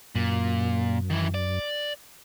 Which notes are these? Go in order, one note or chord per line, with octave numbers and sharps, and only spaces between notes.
F#2 A#2
D#3 E3
D5